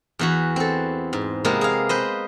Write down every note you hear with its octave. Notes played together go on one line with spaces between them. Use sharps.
E2 E3 F#4
C4 A4
G#2
C3 G#3 A#3 B3 A#4
G#4 F5
B4 C5 D#5